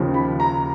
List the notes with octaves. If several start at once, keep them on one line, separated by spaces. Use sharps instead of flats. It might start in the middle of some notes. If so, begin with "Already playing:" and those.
Already playing: D#2 C#3 F3
B5
A#5